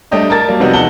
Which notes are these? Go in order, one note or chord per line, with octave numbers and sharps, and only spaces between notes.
G3 A3 D4 G4 D#5 E5
A#4 A5 A6
F#3 G3 A#3
C3 F3 G3 B3 D#4 F#4
E2 C3 D#4 F#5 A5 G7